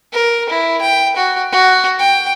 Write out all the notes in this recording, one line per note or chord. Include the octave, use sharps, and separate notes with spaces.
A#4
E4
G5
F#4
F#4
G5